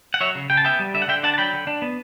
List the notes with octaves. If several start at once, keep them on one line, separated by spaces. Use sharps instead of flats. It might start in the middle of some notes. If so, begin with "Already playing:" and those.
F#5
F#3 C#5 E5
C#3
C#3 G5
A5
B3 E5 G5
G3
D3 E5
F#5
D3 E5 G5
D4 F#5 A5
A5
F#3 G5 B5
D3
D4
B3